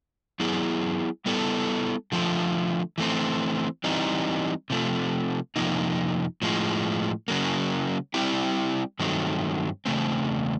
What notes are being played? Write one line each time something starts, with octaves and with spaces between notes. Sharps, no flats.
F#3 B3 E4 G#4
G3 B3 E4 A4
D3 F3 A3
E3 A3 C4
E3 G3 C4 D#4
C3 F3 A3
F2 C3 F3 A#3 D#4
A2 F3 G#3
C#3 F#3 A#3
G3 C4 E4 G4
G2 D#3 F#3 A3 C4
E2 C#3 A3 C4